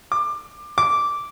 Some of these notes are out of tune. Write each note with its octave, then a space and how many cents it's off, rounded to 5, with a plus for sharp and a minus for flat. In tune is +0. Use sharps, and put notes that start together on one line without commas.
D6 +20
D6 -10